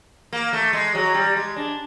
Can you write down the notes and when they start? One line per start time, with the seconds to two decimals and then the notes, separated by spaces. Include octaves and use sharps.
0.33 A#3
0.53 A3
0.73 G#3
0.95 F#3
1.14 G3
1.36 G#3
1.56 D4